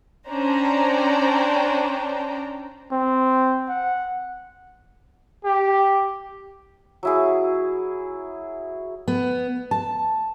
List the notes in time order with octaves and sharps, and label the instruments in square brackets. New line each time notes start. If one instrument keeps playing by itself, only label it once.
[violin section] C#4 D4 C5 D5 G5 A#5
[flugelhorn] C4
F#5
G4
[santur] F#3 E4 G#4
[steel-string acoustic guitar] B3
A5